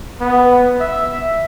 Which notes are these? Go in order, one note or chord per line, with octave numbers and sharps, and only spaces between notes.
B3
E5